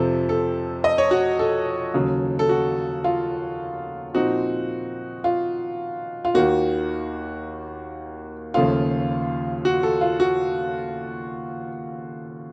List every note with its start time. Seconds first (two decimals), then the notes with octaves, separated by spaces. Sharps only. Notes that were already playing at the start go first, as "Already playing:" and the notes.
Already playing: F2 C3 F3 C4 A4
0.29 A4
0.84 D#5
0.98 C#5
1.11 F#4
1.39 A4
1.94 D#2 C#3 F#3
2.39 A4
2.49 F#4
3.04 F4
4.14 A#2 F3 C4 D#4 F#4
5.24 F4
6.25 F4
6.34 D#2 D#3 A#3 F#4
8.54 D#2 C#3 F3 A3 F4
9.65 F#4
9.83 A4
10.01 F4
10.20 F#4